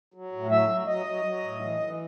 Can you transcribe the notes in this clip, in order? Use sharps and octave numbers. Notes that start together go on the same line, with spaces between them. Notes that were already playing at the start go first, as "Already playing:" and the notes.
F#3
A2
F#3 E5
F#3
F#3 D#5
F#3
F#3
A2
E3
E3